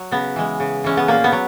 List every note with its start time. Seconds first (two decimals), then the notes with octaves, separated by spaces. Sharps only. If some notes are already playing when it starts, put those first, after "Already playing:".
Already playing: F#3
0.11 C#3 B3
0.36 E3 G#3
0.60 C#3
0.84 E3 G#3 C#4
0.97 B3
1.08 A#2 A#3
1.24 B3
1.32 F#3